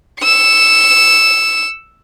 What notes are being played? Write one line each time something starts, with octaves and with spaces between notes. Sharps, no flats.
E6 C#7